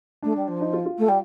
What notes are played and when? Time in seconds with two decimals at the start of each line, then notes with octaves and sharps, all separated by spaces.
0.22 A3 D4
0.36 G3
0.47 F3
0.61 D#4
0.73 F4
0.86 F4
0.98 A3
1.08 G3